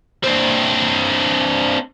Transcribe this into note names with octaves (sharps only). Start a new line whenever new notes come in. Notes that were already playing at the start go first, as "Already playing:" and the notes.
C4 D4